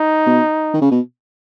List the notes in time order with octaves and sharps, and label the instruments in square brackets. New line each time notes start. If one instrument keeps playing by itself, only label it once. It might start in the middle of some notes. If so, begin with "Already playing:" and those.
Already playing: [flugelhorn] D#4
[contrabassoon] B2
D#3
C#3
B2